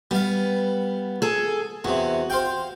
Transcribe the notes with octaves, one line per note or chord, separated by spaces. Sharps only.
G3 B3 F5
G#4 A4
E2 C3 F#4
C5 F5 G5